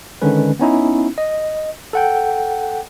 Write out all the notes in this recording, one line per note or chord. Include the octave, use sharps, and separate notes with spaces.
D3 D#3 G#3 C#4 B4
B3 C#4 D#4 E4
D#5
A4 F#5 G5